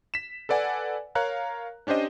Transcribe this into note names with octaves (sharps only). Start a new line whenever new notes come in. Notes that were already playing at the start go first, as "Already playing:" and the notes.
B6 E7
A4 B4 D5 F#5 G#5
A#4 C#5 F5 A#5 F#6
C#4 D4 G4 C5 D#5